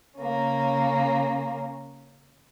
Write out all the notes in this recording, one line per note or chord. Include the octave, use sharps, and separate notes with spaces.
C#3 A#3 C#4